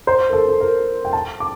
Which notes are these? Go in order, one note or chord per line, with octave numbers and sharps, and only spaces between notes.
C5
A#4
A4
A4
A#4
G5
A5
D6